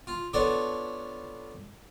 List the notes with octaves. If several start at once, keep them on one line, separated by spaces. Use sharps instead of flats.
F4
B3 D4 F4 A4 C#5